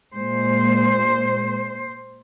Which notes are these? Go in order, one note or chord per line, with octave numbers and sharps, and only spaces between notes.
A#2 G#3 C5